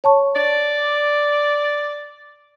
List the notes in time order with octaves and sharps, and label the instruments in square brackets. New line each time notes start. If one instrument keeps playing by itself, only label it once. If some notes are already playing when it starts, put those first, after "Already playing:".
[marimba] C#5 A5 C#6
[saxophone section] D5